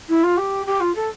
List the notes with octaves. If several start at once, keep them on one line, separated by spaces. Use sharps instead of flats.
E4
F4
G4
G4
F4
A4